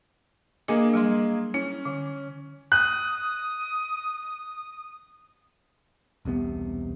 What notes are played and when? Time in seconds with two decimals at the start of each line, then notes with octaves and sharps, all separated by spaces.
0.68 A#3 D4 G#4 D#5 G#5 D6
0.93 F#3 G3 C6
1.54 C#4 E4
1.85 D3
2.72 D#6 F#6
6.25 E1 C2 C3 B3